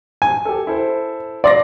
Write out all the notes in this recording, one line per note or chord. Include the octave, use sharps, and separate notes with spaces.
G#5
G4 A4
E4 A4 C5
D5 C6 D6 A#6